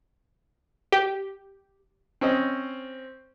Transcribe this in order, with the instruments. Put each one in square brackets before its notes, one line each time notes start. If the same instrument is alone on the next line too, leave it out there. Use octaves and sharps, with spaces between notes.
[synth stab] G4
[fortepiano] C4 C#4 C5 D#5